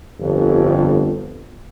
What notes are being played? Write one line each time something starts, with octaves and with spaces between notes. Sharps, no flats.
G1 F2